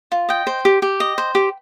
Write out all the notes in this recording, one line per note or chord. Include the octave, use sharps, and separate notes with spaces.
F4
D#5 G5
C5
G4
G4
D#5
C5
G4